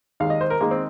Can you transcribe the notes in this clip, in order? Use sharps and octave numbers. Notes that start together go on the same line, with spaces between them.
D#2 D#3 G#3 F5
D#5
C5
A#4
D#3 G#3 A#3
C4